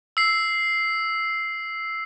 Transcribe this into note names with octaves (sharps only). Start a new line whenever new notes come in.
E6 C7